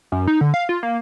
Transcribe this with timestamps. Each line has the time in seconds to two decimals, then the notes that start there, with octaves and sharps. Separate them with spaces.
0.12 F#2
0.27 D#4
0.41 D3
0.54 F5
0.69 F4
0.83 A#3